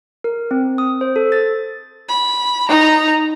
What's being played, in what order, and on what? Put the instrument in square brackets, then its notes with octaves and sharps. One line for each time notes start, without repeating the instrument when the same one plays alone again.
[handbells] A#4
C4
D#6
C5
A4
A6
[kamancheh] B5
D#4 A#5